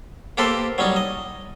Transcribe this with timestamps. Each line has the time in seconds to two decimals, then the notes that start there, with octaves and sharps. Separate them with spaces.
0.38 A#3 G4 A4 B4 C5
0.78 F#3 G3 C#4 D#4
0.96 D#5